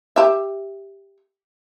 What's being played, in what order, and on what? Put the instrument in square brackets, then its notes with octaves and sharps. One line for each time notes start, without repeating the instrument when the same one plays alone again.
[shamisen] G4 E5